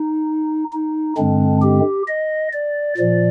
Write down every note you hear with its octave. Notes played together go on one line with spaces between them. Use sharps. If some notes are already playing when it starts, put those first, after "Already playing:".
Already playing: D#4
D#4
G2 D3 G#3 C4 D4
G4
D#5
D5
A#2 F3 D5